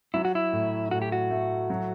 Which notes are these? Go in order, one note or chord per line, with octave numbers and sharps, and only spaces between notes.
F#3 E4
F#4
E4
A2
A2 F#4
G4
F#4
A3
F#3